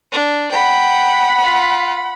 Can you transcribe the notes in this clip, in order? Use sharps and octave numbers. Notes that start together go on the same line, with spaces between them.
D4
F#5 G5 B5
F4